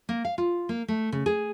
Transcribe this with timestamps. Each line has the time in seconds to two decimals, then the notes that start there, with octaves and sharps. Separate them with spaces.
0.09 A#3
0.25 F5
0.38 F4
0.69 A#3
0.88 A3
1.12 C#3
1.26 G#4